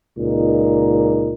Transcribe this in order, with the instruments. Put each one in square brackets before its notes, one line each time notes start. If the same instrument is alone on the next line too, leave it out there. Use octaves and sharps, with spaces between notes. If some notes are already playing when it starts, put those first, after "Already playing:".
[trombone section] C#2 A#2 D#4